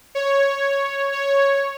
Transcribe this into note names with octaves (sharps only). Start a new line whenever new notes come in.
C#5
C#5